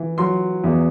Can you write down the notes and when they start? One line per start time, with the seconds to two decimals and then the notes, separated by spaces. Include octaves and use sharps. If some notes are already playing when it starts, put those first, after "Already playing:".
Already playing: E3
0.18 F#3 C6
0.64 E2